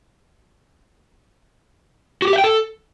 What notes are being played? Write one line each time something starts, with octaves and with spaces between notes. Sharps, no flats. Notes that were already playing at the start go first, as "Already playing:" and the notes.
F#4
G4
E5
G5
A4